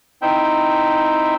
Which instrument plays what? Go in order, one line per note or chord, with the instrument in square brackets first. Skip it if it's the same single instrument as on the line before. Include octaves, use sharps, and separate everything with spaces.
[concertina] C4 D#4 E4 E5 G5